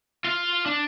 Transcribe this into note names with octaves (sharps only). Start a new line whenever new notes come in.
F4 F5
D4